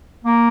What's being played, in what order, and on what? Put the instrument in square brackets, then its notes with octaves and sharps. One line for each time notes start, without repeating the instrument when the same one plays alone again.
[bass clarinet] A#3